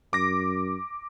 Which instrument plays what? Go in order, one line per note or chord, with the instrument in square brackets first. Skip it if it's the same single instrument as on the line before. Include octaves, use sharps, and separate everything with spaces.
[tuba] F#2 [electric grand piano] D6 A#6